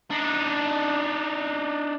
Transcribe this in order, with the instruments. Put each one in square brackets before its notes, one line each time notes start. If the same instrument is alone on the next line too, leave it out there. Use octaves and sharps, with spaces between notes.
[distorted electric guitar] D4 D#4